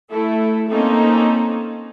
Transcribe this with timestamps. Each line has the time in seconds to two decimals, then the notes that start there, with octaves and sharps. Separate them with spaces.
0.10 A3 E4 A4
0.69 A#3 C4 C#4 D#4 A4